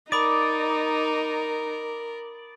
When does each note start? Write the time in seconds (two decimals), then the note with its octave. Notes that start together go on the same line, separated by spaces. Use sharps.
0.12 D#4 A#4 D5 B5 D6 D#6